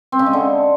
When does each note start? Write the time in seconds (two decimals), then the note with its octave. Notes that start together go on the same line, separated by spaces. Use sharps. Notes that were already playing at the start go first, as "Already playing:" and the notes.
0.12 C4
0.19 C#3
0.26 G#3
0.33 D3